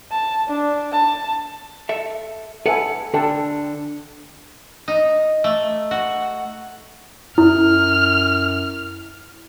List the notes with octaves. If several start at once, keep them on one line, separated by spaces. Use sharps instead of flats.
A5
D4
A5
A4 E5
A4 B4 E5 F#5 G#5
D3 A4 G5 A5
D#4
A3
F#4
F#2 E4 F6